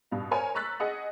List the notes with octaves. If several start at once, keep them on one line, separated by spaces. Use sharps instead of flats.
G2 B2 F5
A#4 C5 C#5 G#5
A#5 C#6 E6 F#6 A6 B6
G#4 D#5 F#5